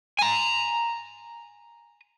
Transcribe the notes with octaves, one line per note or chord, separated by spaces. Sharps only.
G#5 A#5